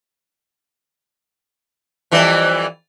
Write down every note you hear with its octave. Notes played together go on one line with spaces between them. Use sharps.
F2 E3 G3